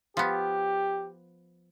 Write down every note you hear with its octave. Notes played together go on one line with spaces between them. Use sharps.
F3 B3 G4